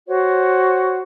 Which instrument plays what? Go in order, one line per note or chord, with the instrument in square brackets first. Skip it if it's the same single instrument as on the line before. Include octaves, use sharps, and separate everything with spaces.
[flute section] F#4 C5 C#5